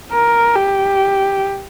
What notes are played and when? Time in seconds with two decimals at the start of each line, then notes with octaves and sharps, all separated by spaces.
0.12 A#4
0.55 G4